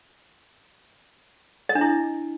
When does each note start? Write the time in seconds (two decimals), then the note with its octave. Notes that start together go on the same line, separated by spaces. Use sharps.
1.69 D#5
1.75 D4
1.81 E4